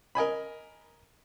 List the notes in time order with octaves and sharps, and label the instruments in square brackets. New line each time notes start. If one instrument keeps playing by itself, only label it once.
[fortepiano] A#4 D#5 G#5 B5